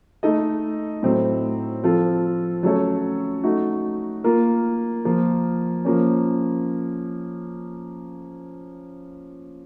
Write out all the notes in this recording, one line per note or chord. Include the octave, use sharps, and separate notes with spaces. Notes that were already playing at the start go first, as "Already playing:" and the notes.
A3 D#4 A4 D#5
A2 F#3 C4
F3 C4 F4 A4
F#3 A3 C#4 A4 C#5
A3 D#4 F#4
A#3 F4 A#4
F3 A#3 F4
F3 A#3 C#4